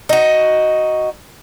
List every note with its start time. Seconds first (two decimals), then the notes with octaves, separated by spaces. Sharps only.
0.09 D#4 F#4